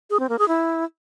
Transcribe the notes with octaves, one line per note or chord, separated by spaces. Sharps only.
G#4
C4
A#3
G#4
E4